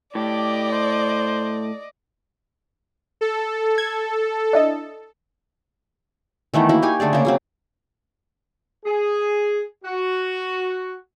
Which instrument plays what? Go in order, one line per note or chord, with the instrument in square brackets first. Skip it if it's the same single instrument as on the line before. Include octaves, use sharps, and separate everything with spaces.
[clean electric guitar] A2 [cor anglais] G4 [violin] D5 D#5
[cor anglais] C5
[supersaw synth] A4
[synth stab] G#6
D4 E4 D#5
[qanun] D#3 E3 A3 B3
A#3 E4 F#4
D#4 G4 G#5
D3 A3 G#4 D5
C#3 A#3
C#3 F#3 C4
[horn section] G#4
F#4